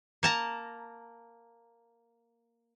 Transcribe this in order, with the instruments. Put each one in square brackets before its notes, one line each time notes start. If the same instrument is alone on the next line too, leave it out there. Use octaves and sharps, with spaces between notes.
[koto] A#3 A5 A#5